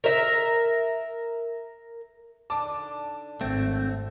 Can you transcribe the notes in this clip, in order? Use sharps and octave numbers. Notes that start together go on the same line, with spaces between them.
A#4 E5
D3 D4 D#4 A5 D6
G#1 A3 C4